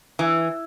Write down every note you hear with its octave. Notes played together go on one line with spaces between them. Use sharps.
E3